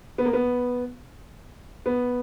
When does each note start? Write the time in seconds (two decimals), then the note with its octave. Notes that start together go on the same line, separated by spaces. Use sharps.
0.18 B3
0.25 A#3
0.33 B3
1.86 B3